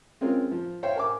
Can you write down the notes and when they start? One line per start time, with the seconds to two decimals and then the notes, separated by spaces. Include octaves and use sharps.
0.21 G#3 C4 C#4 F4 A#4
0.51 F3
0.83 C5 C#5 E5 F5 G5
0.96 A#4 G#5 D6